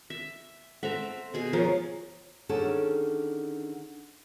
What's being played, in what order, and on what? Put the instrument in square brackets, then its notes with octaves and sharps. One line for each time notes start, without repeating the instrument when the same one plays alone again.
[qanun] E5
[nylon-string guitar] C4 A4 F#5 [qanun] E5 A#5
[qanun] B2 G#4 G#5
[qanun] F3 [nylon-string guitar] A#4 C#5
[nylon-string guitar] D3 D#3 C#4 G#4 A4